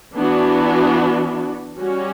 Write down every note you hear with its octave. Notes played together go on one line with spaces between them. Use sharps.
E3 B3 D4 F#4
G3 C#4 F#4